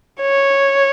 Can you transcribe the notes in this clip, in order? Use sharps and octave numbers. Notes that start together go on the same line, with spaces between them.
C#5